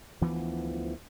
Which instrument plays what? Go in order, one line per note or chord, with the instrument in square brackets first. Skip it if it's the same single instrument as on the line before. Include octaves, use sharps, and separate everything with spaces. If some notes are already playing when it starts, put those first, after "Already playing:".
[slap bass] D2 E3 F3 B3